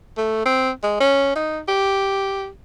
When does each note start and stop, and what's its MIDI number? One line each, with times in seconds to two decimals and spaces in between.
0.18 0.43 57
0.46 0.71 60
0.83 0.96 56
1.00 1.35 61
1.35 1.60 63
1.68 2.48 67